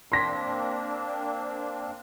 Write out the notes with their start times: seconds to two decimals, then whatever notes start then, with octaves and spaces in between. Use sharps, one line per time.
0.12 A#3 C4 D4 C6 A#6 B6